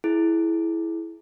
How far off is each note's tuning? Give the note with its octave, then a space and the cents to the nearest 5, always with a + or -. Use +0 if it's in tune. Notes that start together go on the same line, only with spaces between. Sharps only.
E4 +0 G#4 +30